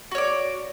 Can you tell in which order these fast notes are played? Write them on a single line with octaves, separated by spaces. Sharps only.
F#4 C#5 D5